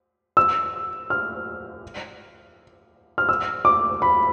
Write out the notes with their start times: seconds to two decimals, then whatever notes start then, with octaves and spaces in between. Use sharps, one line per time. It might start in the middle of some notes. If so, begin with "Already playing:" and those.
0.37 E6
1.10 F6
3.18 F6
3.29 E6
3.65 D6
4.02 B5